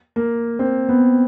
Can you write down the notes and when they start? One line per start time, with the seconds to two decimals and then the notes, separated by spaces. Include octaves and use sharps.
0.16 A#3
0.59 C4
0.89 B3